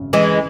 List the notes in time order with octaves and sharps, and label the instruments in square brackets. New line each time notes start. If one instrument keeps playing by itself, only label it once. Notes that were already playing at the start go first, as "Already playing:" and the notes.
Already playing: [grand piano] G#1 F#2 C#3
[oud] E3 G#3